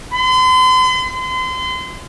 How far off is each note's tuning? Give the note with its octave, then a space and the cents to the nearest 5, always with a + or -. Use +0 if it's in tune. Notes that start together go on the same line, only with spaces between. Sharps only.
C6 -45
C6 -35